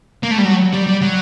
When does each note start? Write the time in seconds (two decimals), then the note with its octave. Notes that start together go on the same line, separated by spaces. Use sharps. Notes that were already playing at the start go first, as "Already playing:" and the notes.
0.23 A#3
0.31 A3
0.38 G3
0.45 F#3
0.73 G3
0.87 G3
1.02 F#3